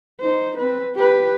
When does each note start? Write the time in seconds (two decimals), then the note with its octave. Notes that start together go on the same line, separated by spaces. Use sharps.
0.21 D#4 C5
0.58 C4 B4
0.95 G4 B4